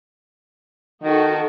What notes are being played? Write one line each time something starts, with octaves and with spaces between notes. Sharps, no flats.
D#3 D#4 F#4 A4